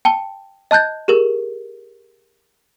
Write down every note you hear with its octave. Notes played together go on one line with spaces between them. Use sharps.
G5 A5 G7
D#5 A5 F#6 G6 A6
G4 G#4 A#4